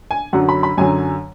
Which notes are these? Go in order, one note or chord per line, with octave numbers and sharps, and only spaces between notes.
G#5
F#2 D3 F#3 F#5
B5
B5
F#2 D3 F#3 G#5